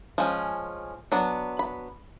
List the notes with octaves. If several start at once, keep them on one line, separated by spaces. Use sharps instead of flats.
F3 G#3 C#4
F#3 B3 D4
B5